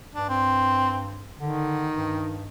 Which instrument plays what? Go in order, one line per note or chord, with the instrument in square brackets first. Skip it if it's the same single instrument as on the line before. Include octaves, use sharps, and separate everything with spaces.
[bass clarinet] G2 [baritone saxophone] D4
[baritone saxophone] C4
[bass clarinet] D3 [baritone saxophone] D#3
[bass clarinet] G2